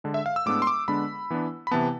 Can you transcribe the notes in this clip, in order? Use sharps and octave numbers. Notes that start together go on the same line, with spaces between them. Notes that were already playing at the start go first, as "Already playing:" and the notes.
D3 G#3 D4
E5
F5
E6
A2 G#3 B3 D4 D6
C6
D6
D3 G#3 B3 D4 B5
E3 B3 D4
B5
C3 E3 B3 A5